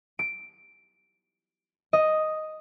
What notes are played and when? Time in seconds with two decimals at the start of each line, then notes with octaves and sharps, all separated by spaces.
0.19 D7
1.93 D#5